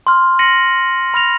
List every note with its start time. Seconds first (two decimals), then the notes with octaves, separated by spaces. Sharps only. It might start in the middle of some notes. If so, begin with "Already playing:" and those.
0.07 C6 F6
0.39 A#6 C#7 D#7 F#7
1.14 B5 F6 A#6 F7